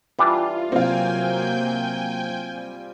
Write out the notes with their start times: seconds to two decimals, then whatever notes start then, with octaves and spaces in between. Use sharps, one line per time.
0.19 E3 G3 D4 F4
0.72 C3 F#3 A#3 C4 F4 G5 G#5 G6
2.55 G3